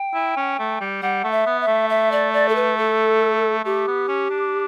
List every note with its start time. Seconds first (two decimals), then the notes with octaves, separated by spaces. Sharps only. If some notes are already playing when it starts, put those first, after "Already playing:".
Already playing: G5
0.14 E4
0.37 C#4
0.59 A3
0.81 G3
1.02 G3 F#5
1.24 A3
1.31 E5
1.46 B3
1.61 E5
1.67 A3
1.90 E5
2.12 D5
2.33 D5
2.49 A4
2.55 B4
2.78 A4
3.64 A3 G4
3.87 B3
4.08 C#4
4.30 D4